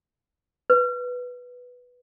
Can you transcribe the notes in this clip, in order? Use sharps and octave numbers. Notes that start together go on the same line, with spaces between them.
B4